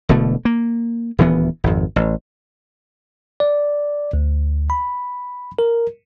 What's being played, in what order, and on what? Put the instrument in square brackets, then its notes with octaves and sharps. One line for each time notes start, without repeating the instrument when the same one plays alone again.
[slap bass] E1 B2 D3 A3
A#3
D#1 D2 E3 B3
G#1 F2
A1
[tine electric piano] D5
D2
B5
A#4